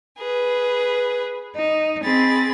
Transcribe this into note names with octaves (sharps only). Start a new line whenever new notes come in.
G#4 B4
D#4
C4 G#4 B5 A6